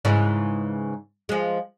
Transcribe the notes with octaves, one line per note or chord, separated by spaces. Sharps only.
G#2 C#3 E3
F3 G#3